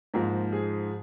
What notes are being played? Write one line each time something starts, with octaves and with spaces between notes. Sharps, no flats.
G#2 F3 A#3
G#4